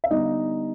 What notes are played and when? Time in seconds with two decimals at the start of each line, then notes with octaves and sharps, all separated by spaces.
0.04 E5
0.11 D3 G3 B3 D#4 D#5